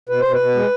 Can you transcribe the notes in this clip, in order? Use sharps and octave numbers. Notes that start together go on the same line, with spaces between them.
B2 B4
B2 C5
B4
B2
G#3